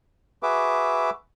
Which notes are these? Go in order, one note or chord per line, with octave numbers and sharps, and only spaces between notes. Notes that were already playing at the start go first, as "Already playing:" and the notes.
F#4 G#4 B4 E5 D6